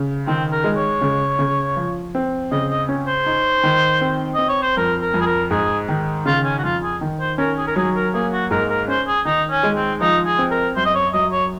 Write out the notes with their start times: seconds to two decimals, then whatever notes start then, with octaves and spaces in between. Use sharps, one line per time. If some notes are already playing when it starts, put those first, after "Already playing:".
Already playing: C#3
0.26 D#3 C4
0.51 A#4
0.64 G#3
0.77 C#5
1.01 C#3
1.39 C#3
1.76 F3
2.15 C4
2.51 C#3 D#5
2.70 D#5
2.89 C#4
3.08 C5
3.26 D#4
3.63 D#3
4.01 C4
4.35 C4 D#5
4.49 C#5
4.62 C5
4.77 F2 A#4
5.02 A#4
5.14 F2
5.20 G#4
5.26 A#4
5.51 G#2 G#4
5.89 D#3
6.26 C#3 F4
6.44 C#4
6.58 F#4
6.63 F2 F4
6.83 G#4
7.01 D#3
7.20 C5
7.38 C#4 A#4
7.58 G#4
7.67 A#4
7.76 F#3 G#4
7.95 A#4
8.14 A#3 G#4
8.32 F#4
8.51 G#2 A#4
8.70 A#4
8.88 C#4 C5
9.07 G#4
9.25 D#3 D#4
9.51 C#4
9.63 G#3
9.76 C4
10.00 F3 D#4
10.26 G#4
10.38 C4
10.51 A#4
10.76 F#2 C5
10.85 D#5
10.95 C#5
11.13 F#3 D#5
11.32 C#5